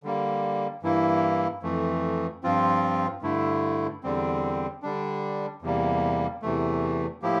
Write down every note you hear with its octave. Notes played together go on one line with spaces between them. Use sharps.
D3 G3 A#3
G2 E3 A#3 E4
F2 E3 A3
G2 F3 C4 F4
G2 D3 A3 E4
E2 D3 G3 C4
D3 G3 D4
E2 C3 G3 A#3
E2 C3 E3 A3
A2 F3 A#3 E4 G4